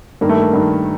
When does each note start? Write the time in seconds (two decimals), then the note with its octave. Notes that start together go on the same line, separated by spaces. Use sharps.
0.21 G2 D#3 A#3
0.29 A3
0.37 A#3
0.53 G2 D#3